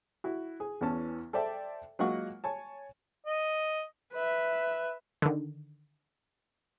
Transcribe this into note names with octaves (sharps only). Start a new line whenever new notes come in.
E4 F#4
G#4
E2 E3 B3 C#4 A5
A4 C5 D5 E5 G5 A5
F#3 G#3 A#3 F4 F#5 C#6
C#5 G#5 A5
D#5
B4 E5
D3 D#3